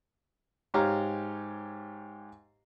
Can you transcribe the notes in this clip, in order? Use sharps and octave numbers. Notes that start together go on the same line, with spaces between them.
G#2 G4 C#5 F5 A#5